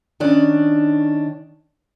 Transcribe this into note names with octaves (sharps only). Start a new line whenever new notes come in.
D#3 C#4 D4